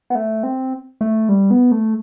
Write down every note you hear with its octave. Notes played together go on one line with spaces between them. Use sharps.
B3
A3
C4
A3
G3
B3
A3